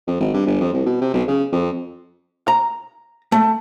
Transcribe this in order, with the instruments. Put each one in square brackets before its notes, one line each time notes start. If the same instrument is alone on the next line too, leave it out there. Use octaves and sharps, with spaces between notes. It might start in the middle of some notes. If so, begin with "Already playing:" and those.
[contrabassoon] F2
G#1
G2
G1
F2
C2
B2
C3
B1
C#3
F2
[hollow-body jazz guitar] A#5
A3